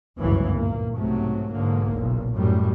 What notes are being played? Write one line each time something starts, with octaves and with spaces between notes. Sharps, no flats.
G1 C#2 F#2 A2 E3 F#3
A#2 A#3
B1 G#2 C3 F#3 A3
B1 G#2 D3 A#3
F#1 B1 A#2
A1 F#2 A2 G3